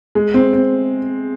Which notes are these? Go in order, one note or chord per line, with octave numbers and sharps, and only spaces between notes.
G#3
C4
C4